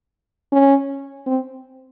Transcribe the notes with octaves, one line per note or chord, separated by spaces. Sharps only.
C#4
C4